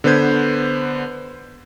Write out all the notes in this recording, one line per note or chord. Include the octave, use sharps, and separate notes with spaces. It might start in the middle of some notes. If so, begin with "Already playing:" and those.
D3 B3 B4 C5 G6 G#6